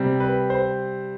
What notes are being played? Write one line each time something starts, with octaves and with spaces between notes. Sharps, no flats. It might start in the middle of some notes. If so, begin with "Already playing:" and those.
Already playing: C3 G3 C4
B4
C5